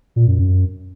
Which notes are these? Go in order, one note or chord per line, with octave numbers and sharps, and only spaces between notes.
A#2
F#2
F#2